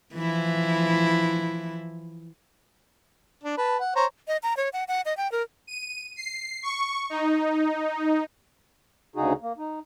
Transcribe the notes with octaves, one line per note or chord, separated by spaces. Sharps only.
E3 F3 E4
D4
B4 A5
F#5
C5 C#5 A#5
D#5
A#5
C#5
F#5
F#5
D#5
G5
A#4
D#7
C7
C#6
D#4
D2 C#3 D#4 F#4 G#4
A#3
D#4